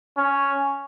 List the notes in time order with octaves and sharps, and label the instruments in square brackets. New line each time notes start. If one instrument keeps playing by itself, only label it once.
[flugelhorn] C#4